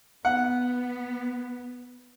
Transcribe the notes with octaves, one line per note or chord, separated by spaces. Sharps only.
B3 F#5